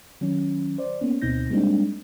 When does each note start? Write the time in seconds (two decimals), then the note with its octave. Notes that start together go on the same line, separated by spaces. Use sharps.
0.21 D#3 F#3 C#4
0.78 C5 D5
1.01 A#3 B3 C#4
1.22 D2 B2 C4 D#4 G6 A#6
1.50 G3 G#3 A#3 C4 D4 D#4